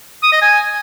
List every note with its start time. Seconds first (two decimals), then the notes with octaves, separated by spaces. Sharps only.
0.23 D#6
0.32 D#5
0.42 G#5